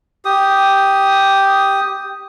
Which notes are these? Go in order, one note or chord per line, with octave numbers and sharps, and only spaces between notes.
G4 D#6